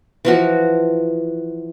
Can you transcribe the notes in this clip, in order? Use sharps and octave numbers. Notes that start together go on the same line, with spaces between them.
E3 F3 F#4